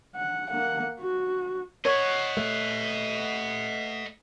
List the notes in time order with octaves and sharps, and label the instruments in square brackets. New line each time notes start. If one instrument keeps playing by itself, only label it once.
[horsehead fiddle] F#5
A#3 F#5
F#4
[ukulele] C#5 [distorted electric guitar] D#5 F#5
[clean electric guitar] A3